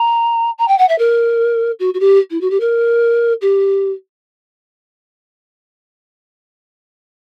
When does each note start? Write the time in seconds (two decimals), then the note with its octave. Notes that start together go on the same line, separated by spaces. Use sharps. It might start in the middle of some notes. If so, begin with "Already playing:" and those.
Already playing: A#5
0.58 A#5
0.68 G5
0.78 F#5
0.88 E5
0.98 A#4
1.79 F#4
1.94 F#4
2.00 G4
2.30 E4
2.41 F#4
2.50 G4
2.60 A#4
3.41 G4